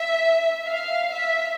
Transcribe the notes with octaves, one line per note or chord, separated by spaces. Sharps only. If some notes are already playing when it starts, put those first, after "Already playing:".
Already playing: E5
F5
E5